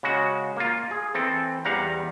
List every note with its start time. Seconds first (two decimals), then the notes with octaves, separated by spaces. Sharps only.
0.03 C#3 G#3 F#4
0.57 A#3 F4
0.91 G#4
1.14 E3 C4 A4
1.65 E2 G3 F5 F#5 A#5